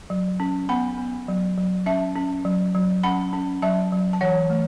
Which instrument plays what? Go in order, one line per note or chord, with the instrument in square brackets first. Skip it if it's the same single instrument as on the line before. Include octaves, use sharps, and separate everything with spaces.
[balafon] F#3
C#4
B3 F#5 B5
B3
F#3
F#3
C#4 E5 A5
C#4
F#3
F#3
C#4 F#5 B5
C#4
F#3 E5 A5
F#3
A5
E3 C#5 F#5
A3